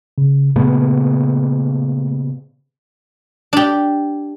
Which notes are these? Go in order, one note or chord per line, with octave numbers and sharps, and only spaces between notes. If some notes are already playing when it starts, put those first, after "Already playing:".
C#3
A#2 C#3 A3 B3
D4 G4